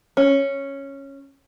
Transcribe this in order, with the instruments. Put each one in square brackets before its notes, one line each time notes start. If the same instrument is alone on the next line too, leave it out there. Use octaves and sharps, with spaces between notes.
[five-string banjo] C#4